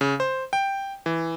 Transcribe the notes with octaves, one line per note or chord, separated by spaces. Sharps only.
C#3
C5
G5
E3